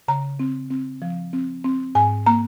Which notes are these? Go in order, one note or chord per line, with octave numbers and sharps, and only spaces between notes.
C#3 A#5
C4
C4
F3
C4
C4
G#2 G#5
A#3 A#5